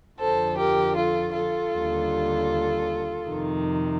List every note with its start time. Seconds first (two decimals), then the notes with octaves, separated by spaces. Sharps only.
0.19 F2 D3 F3 A4 C5
0.57 G4 A#4
0.96 F4 A4
1.34 F4 A4
1.73 D#2 D3 G3
3.26 F2 C3 D#3